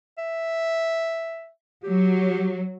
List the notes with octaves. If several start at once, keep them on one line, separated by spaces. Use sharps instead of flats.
E5
F#3 G4